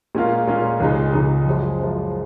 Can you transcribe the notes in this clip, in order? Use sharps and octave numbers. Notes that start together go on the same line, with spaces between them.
A#2 G#3 C#4 F4 A#4
A#2 G#3 C#4 F4 A#4
C#2 C#3 G#3 D#4
C#2 C#3 G#3 D#4
F#2 F3 G#3
F#2 F3 G#3